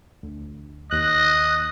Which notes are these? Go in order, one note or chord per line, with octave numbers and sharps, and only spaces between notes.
D2
D#2 D#5 F#6